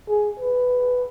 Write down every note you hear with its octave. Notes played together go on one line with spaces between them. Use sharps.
G#4
B4